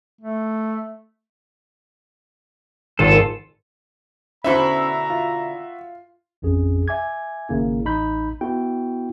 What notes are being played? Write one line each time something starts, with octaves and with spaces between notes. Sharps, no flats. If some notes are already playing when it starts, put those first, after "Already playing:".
A3
G#1 F4 A4
B2 D3 C#4 E4 F#4 C5 E5 A#5
F4
A1 F2 C#4 G#4
E5 G#5 D6 G#6
G#1 C#3 A#3 E4
A1 D#4 B5 G6
B3 E4 F#4 G5